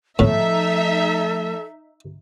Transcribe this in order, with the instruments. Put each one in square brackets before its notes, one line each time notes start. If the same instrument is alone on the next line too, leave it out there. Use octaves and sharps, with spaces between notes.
[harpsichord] A2 [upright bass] F3 A3 [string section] D#4 E5 [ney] A4